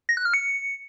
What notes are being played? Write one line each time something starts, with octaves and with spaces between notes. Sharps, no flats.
A#6
F#6
F6
C#7